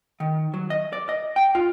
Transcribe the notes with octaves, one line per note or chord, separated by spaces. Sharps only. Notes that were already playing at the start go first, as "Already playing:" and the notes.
D#3
F#3
D#5
D5
D#5
G5
F4